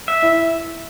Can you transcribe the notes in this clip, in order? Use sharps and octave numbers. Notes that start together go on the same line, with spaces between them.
E5
E4